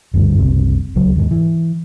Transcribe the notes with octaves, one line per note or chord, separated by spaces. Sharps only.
F#1 D2 G2
F#1 C2 C3
D1 C#2 F#3
D#2 G#2
E3